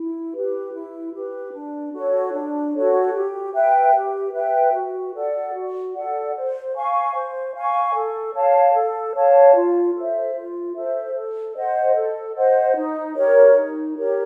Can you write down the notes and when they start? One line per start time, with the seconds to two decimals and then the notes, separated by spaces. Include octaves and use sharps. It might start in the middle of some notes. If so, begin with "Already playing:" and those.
Already playing: E4
0.33 G4 B4
0.73 E4
1.14 G4 B4
1.53 D4
1.93 F#4 A4 C#5
2.33 D4
2.73 F#4 A4 C#5
3.13 G4
3.54 B4 E5 G5
3.94 G4
4.34 B4 E5 G5
4.74 F#4
5.14 A4 D5 F#5
5.54 F#4
5.94 A4 D5 F#5
6.35 C5
6.74 F5 G#5 C#6
7.15 C5
7.54 F5 G#5 C#6
7.94 A4
8.35 C#5 F5 A5
8.74 A4
9.15 C#5 F5 A5
9.55 F4
9.95 A4 C5 E5
10.35 F4
10.76 A4 C5 E5
11.15 A4
11.55 C5 D#5 F#5
11.95 A4
12.36 C5 D#5 F#5
12.76 D#4
13.16 G4 A#4 C#5
13.55 D#4
13.95 G4 A#4 C#5